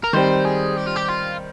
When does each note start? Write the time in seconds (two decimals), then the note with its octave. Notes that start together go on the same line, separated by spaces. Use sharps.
0.04 A#4
0.13 D#3 G3 C4 C5
0.45 G#4
0.77 G4
0.87 F4
0.97 G4
1.09 F4